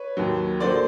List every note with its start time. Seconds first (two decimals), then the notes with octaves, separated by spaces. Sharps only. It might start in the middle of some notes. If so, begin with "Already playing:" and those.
Already playing: B4 C#5
0.17 D#2 D#3 F#3
0.60 D3 F#3 A#3 C5 D5